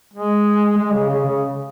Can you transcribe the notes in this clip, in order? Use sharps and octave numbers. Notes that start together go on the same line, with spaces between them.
G#3
G#3
C#3
C#3
C#3